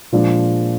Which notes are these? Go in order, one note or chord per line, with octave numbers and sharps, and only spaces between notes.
A#2 F3 G#3 D4